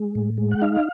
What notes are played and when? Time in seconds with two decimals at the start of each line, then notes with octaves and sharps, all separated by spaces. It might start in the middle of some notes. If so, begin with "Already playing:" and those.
Already playing: G#3
0.15 A2
0.38 G#3
0.51 F#5
0.62 D#4 F5